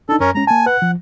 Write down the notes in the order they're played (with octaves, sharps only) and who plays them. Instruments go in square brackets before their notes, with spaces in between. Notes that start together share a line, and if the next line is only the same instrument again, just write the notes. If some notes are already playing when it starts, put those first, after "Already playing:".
[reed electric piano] D4 D#4 [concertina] A4
[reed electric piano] F#2 [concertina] C#4 A#4
[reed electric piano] G#3 C#4 [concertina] A#5
[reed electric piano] A#3 A5 [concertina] G#5
[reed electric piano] B4 F#6 [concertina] F#5
[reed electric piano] F3